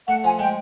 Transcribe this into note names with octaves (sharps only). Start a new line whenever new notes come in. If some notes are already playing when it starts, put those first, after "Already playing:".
A3 F#5
F3 G#5
G#3 G5